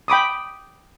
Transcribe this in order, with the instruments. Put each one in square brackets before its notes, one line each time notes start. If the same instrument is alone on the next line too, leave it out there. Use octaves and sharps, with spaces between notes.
[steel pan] G5 B5 D6 D#6